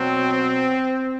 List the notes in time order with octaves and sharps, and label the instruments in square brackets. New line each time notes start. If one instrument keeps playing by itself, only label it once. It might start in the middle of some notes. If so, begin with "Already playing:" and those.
Already playing: [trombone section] B2 F#3 C4